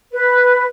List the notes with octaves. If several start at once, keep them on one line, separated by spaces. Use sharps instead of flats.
B4